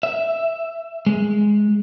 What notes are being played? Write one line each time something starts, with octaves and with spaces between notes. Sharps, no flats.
E5
G#3